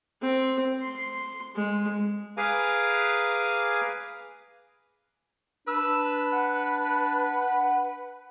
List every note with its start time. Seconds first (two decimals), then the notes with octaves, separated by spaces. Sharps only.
0.21 C4
0.81 C6
1.55 G#3
2.37 G#4 B4 F5 G#5 A#5 D6
5.67 D4 B4 E6
6.32 F#5